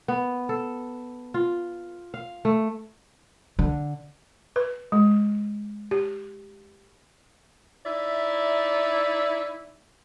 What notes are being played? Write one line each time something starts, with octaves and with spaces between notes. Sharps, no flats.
B3
A4
F4
F5
A3
D3
B4
G#3
G4
D#4 E4 D5 E5